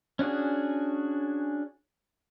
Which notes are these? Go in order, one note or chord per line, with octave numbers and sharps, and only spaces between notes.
C#4 D4 F#4 G#4